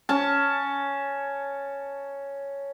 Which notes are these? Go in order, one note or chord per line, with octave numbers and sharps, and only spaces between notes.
C#4 A5